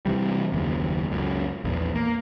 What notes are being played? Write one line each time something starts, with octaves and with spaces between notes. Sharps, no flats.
C3 E3 G3
F#1 D#2
C#2 F#2
A#1 E2
A#3